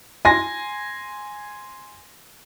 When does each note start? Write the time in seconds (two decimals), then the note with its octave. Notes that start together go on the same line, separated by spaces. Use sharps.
0.25 G#5 C6 A#6